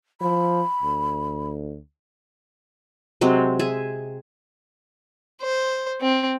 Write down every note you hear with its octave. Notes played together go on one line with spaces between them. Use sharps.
F3 B5
D2
C3 F#3 G#3 C4
G#4 E5
C5
C4